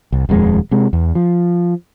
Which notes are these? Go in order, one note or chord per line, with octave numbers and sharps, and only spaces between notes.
C2
D#1 F2 G3 G#3
C3 G#3
E2
F3